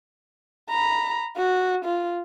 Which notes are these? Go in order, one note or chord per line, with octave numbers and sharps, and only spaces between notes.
A#5 B5
F#4
F4